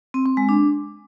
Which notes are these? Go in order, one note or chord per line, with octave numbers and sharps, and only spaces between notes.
C4
C4
G#3
D4